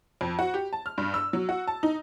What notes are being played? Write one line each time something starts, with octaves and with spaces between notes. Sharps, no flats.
F2
F#4
G4
A5
F6
G2
E6
F#3
F#4
A5
D#4